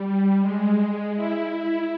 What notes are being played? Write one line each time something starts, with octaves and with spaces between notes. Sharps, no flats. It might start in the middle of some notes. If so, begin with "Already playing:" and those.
Already playing: G3
G#3
E4